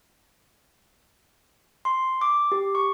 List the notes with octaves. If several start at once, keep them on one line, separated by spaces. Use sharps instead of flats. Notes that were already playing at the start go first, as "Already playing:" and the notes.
C6
D6
G4
C#6